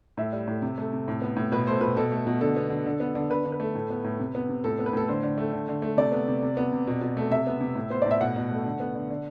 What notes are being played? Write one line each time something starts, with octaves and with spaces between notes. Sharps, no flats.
A2 E5
G3
A2
C3
A3
C3
A2
B3
A2
B2 B4
A3 C5
B2 B4
B2 A4
A3
B2
D3 A4
B3
D3
D3
B3
D3
D3 B4
D3
B4
A3
A2
B3
A2
C3
B3
C3
A2 A4
B3
B4
A2 A4
D3 C5
D3
A3
D3
D3
A3
C3 D5
B3
C3
C3
B3
C3
B2
B2
A3
C3 E5
B3
C3
A2
B3 C5
A2 D5
E5
B2 F#5
B2
A3
D3
B3
D3
D3